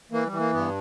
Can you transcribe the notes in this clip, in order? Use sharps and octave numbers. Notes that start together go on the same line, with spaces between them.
E3 A#3
G3
E3
A#3
G2 B3